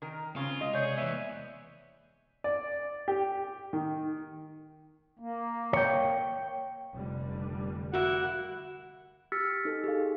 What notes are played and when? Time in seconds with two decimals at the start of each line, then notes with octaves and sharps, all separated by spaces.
0.02 D#3 A#4
0.36 C#3 C4 F4
0.61 C3 G#3 D#5
0.74 G#4 C#5 D5 G6
0.97 E3 B3 E5
2.44 D5
3.08 G4
3.73 D#3
5.19 A#3
5.73 C#5 G5
6.95 F1 D3 G3
7.94 A#3 E4 F#4 F#5
9.32 G4 E6 F6 A6 B6 C#7
9.65 D#4 A4
9.84 G4 G#4 F5